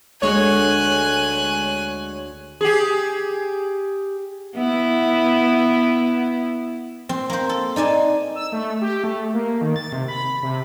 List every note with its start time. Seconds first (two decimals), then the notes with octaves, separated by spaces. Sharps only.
0.22 D2 G#3 C#5 G#5 F#6
2.61 G4 G#4
4.55 B3 E4
7.09 C4
7.30 A#3 C5
7.49 A4
7.76 D#4 D5 G#5 A5
8.36 E6
8.52 A3
8.81 G4
9.04 A3
9.34 A#3
9.61 D#3
9.76 A6
9.92 C3
10.08 B5
10.43 C3